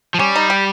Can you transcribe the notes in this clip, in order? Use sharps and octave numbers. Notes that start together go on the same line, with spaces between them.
F3
G3 C#4
D#4
G4